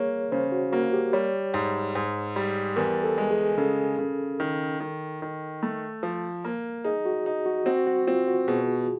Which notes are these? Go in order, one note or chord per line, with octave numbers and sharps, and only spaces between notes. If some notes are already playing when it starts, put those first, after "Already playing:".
Already playing: A#3 G#4 C#5
C#3 C5
F#4
A#3 F#4
G4
G3 C#5
G#2
G#2
G3
E2 A#4
A4
G#3
G#4
C#3 A4
C#3
D#3
D#3
D#3
A3
F3
A#3
D#4 G#4
F#4
D#4
F#4
C4 F#4
F#4
C4 F4
F#4
B2 G#4